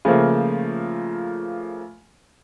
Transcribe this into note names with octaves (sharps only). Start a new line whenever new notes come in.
C#3 F3 A3 A#3